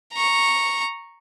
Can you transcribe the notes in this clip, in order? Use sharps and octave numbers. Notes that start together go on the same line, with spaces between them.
A#5 C#6